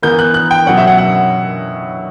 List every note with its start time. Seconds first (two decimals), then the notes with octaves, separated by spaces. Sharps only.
0.02 E3 B3 E4 A#4 G6
0.19 F#6
0.34 F#6
0.51 G5
0.66 B2 F#3 C#4 F#5
0.77 E5
0.87 F#5
0.98 F#5